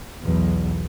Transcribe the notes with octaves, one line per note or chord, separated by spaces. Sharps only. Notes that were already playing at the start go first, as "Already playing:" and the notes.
B1 E2